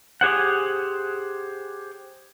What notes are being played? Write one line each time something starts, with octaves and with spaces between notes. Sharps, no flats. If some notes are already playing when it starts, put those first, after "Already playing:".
G4 G#4 C5 F#5